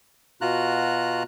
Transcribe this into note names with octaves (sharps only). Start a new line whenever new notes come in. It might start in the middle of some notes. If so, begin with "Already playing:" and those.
B2 F4 F#4 A#5 F#6